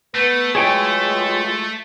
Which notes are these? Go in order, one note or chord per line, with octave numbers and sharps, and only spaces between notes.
A3 B3 B4
E3 F#3 G#3 F4 G#4 C#5 G5